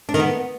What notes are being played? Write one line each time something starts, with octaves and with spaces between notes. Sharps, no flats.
D4
D#3
B3